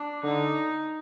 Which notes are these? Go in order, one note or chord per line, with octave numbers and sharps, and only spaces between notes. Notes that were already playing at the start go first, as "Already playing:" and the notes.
Already playing: D4
D3 D#4